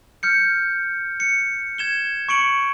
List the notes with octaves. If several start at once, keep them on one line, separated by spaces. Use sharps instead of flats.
F6 G6 C#7
C#7
G#6 E7 G7
C#6 C#7 D7 F#7